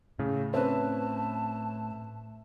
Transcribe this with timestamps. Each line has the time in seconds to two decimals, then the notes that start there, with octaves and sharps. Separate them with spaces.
0.19 A2 C#3
0.54 C4 C#4 B4 E5 A5